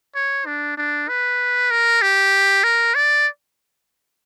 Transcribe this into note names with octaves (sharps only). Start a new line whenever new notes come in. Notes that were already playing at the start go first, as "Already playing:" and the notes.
C#5
D4
D4
B4
A#4
G4
A#4
D5